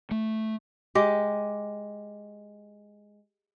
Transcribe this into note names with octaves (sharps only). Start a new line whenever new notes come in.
A3
G#3 G4